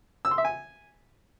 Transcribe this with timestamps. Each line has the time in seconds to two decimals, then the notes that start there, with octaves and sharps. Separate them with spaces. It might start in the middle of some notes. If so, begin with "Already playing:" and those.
0.25 E6
0.31 C6
0.38 E5
0.45 G#5